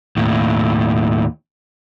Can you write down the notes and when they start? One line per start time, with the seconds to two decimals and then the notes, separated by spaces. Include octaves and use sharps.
0.17 D#2 A2